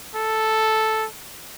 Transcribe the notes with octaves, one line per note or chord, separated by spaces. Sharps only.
A4